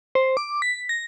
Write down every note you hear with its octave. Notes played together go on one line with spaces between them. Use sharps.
C5
D6
B6
A#6